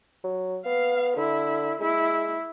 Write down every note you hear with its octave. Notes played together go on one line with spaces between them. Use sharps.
F#3
B3 F5
D3 E4
G#3 E4